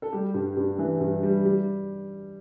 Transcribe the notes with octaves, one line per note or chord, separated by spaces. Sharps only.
A4
G3 G4
G2
G2
E3
G2
G3
G3